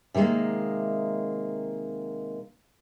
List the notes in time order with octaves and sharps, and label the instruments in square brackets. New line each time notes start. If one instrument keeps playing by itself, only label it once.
[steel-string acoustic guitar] C3 D#3 G3 G#3 A#3